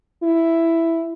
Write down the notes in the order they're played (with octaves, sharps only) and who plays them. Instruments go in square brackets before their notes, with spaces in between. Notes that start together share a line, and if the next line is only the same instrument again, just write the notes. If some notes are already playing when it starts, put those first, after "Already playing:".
[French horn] E4